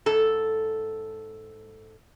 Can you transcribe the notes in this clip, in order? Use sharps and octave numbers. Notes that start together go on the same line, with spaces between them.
G#2 A4